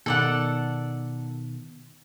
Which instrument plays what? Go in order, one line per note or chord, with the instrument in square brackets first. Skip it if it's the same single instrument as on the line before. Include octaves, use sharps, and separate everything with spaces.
[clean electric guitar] B2 D#3 [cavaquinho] A4 D5 F#5